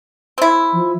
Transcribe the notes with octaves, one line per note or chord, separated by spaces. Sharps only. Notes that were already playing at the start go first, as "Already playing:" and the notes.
C4 E4
F3